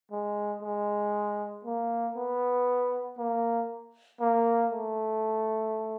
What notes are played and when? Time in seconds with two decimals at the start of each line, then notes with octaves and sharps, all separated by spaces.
0.11 G#3
0.63 G#3
1.65 A#3
2.16 B3
3.18 A#3
4.20 A#3
4.72 A3